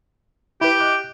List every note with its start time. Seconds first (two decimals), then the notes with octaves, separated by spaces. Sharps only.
0.61 E4 G4 B4
0.80 D#5 D6 F#6